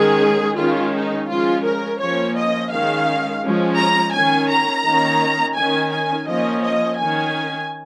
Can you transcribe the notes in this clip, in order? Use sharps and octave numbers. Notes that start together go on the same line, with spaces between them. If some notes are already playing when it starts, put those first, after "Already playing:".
Already playing: D#3 G#3 C#4 G#4
D#3 G#3 C#4 F4
D#4
F3 G#3 C#4 F4
A#4
F3 A#3 C#4 C#5
D#5
D#3 G#3 C#4 F5
F3 G#3 C#4
A#5
D#3 C#4 G#5
A#5
D#3 A#3 C#4
D#3 C#4 G#5
G#5
F3 A#3 C#4 D#5
D#5
D#3 C#4 G#5